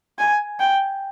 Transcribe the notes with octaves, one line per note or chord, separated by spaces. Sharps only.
G#5
G5